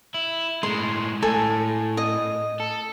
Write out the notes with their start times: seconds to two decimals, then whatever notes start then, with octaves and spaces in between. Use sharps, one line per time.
0.14 E4
0.63 A2 G#3 C6
1.22 A2 A4 G#5
1.97 D#5
2.60 A4